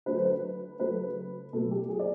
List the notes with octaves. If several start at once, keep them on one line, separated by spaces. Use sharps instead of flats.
D3 F#3 A3 B4
C5
B4
C#3 F#3 A3 B4
B2 F#3 A3 A4
G4
G#4
D5